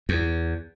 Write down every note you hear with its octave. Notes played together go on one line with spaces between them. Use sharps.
E2